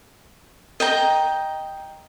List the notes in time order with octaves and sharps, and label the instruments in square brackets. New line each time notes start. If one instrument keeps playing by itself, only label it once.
[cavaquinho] D#5 G5 A#5